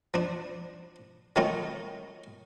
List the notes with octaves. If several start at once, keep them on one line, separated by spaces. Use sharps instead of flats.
F3 D4
D#3 F#3 A3 C#4 D#4 F4